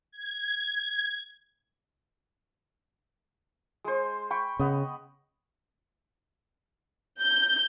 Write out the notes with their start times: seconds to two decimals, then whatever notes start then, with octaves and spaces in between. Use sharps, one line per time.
0.12 G#6
3.85 G#3 C5
4.31 G5 B5 C#6
4.59 C#3 B3 D#5
7.21 G6